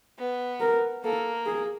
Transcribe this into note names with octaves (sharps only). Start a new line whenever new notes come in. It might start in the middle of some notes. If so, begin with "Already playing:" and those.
B3
A#4
A#3 A4
G#4